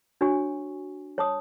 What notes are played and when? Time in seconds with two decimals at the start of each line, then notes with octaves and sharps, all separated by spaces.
0.21 D4 F#4 C#5 G#5 C#6
1.18 C#5 A5 D#6